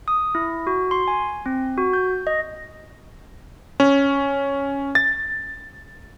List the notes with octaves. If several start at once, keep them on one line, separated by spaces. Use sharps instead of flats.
D#6
E4
F#4
C6
G#5
C4
F#4
G6
D#5
C#4
A6